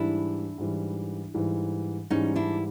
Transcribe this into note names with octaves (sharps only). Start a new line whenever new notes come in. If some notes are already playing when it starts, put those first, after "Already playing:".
Already playing: G#2 E3 G3 D4 E4
G#2 E3 G3
G#2 E3 G3
G#2 E3 G3 C#4 D#4
D4 E4